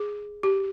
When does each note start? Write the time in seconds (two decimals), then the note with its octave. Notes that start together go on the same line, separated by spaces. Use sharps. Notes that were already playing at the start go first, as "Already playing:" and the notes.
Already playing: G#4
0.43 G4